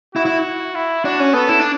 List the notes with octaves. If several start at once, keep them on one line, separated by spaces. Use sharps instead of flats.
E4 F#4
E4
E4
D4 F#4
C#4
B3 A4
E4
D4